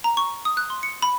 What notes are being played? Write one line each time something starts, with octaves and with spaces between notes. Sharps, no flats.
A#5
C#6
D#6
F#6
C6
C#7
B5